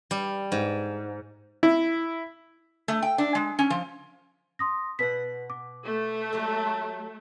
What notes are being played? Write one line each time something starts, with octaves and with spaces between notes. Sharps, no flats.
G3
G#2
E4
A3
G5
D4
G#3
C#4
F3
C6 D#6 A#6
B2 B4 F#5 B6
D6
A3
F#3 G4 A4